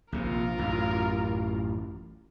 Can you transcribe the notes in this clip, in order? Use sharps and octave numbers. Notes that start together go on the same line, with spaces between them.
A#1 C3 F4 A#4
A1 F#2